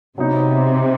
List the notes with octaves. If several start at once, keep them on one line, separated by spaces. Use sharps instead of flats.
C3 F#3 B3 D#4